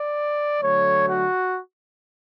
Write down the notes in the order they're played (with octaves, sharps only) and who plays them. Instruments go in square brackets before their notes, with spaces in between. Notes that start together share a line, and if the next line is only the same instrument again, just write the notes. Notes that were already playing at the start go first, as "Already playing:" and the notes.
Already playing: [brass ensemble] D5
D3 F#3 A3 C#5
F#4